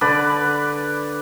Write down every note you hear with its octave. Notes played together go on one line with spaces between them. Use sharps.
D3 B4 D5